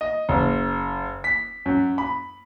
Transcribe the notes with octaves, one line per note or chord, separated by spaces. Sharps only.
D#5
F#1
B6
F#2
B5